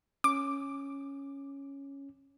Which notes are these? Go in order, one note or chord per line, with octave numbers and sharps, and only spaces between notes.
C#4 D6